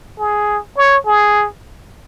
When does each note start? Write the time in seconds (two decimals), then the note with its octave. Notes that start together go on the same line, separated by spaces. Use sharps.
0.19 G#4
0.78 C#5
1.06 G#4